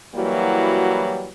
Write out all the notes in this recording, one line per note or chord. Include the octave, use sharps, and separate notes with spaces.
E3 F#3 G3 A#3 E4 F#4